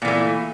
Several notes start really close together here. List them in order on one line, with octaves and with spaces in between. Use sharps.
A#2 E3 A#3 A3